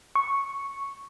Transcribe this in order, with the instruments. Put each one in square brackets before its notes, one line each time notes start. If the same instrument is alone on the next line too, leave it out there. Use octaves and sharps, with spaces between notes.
[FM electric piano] C#6